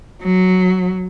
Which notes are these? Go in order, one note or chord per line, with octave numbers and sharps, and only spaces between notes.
F#3